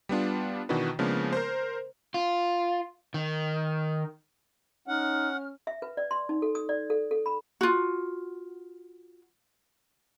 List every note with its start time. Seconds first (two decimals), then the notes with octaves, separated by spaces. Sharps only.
0.09 G3 B3 D4 F4
0.69 B2 D#3 E3 D4 F#4 B4
0.99 C#3 F3 G#3 A#3 B3 D4
1.33 A#4 C5
2.14 F4
3.14 D#3
4.88 C#4 D#4 F#5 F6
5.67 E5
5.82 B4
5.97 D5
6.11 C6
6.29 D#4
6.42 A4
6.55 D#6
6.69 D5
6.90 A4
7.11 A4
7.26 B5
7.61 F4 F#4